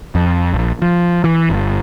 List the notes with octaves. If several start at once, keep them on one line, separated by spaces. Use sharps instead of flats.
F2
A#1
F3
E3
G1